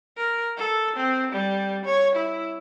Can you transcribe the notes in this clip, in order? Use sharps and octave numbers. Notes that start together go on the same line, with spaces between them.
A#4
A4
C4
G3
C#5
E4